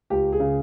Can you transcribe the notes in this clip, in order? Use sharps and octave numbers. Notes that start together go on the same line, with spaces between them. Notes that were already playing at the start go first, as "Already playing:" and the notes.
C#2 G4
G#4
C#3